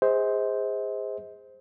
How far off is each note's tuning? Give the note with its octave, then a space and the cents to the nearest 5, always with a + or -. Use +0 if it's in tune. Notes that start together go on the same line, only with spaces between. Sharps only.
G#4 -25 C5 -5 D#5 +40